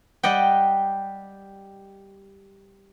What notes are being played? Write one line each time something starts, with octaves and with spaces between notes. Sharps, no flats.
G3 G4 D#5 F#5 G5